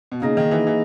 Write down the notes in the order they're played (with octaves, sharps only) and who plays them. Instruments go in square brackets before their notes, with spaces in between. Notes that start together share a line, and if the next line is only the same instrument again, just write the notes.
[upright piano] B2
[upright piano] C#3 [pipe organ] A#3 D#4 G#4 D#5
[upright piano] D#3
E3
E3